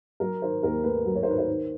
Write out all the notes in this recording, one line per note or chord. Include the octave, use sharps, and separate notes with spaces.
F#3 A#4
D#3 C5
D#2 A#4
A3 B4
F#3
C#5
C5
D#3 B4
C5
D#3